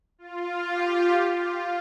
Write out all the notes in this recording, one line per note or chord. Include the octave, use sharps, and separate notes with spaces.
F4
G4
F4